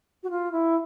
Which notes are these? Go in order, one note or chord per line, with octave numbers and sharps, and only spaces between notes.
F#4
F4
E4